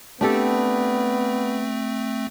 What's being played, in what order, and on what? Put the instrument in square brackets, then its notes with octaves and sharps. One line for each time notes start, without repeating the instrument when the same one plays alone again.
[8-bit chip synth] A3 C4 [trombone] B3 [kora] D4 G4 A4